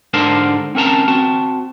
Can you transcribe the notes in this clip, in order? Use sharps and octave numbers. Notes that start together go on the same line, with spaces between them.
G#2 D3 D4 A#4 C5 A5
C4 C#4 A#4 A5 A#5
C4 F#4 A5